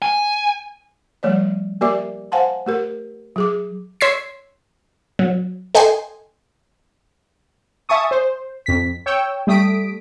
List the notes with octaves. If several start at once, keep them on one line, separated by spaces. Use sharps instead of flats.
G#5
F3 G3 A3 C#5 D5
A#3 G4 A#4 D5 E5 D6
C5 F5 F#5 G#5 A5 C6
A3 G4 A#4
F#3 G#4 D6
C#5 C6 E6 G#6 B6 C7
F#3
A4 D#5 G5 G#5 C6
E5 G#5 A5 C#6 D#6
C5
F2 B6
C#5 G5 E6
G3 A3 D#6 B6 D7